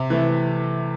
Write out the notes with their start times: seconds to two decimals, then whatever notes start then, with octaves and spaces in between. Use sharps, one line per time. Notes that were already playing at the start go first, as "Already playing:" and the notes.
Already playing: C3
0.10 E3 A3